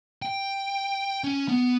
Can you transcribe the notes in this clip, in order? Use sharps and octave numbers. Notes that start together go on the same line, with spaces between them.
G5
C#4
B3